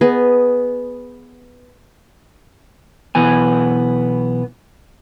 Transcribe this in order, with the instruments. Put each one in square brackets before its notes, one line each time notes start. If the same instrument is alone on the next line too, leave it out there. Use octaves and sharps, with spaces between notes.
[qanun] B3 G#4 D#5
[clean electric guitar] B1 E3 B3 G#5